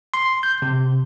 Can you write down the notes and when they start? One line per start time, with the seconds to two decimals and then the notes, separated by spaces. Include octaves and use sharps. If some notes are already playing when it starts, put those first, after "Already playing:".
0.14 C6
0.43 G6
0.62 C3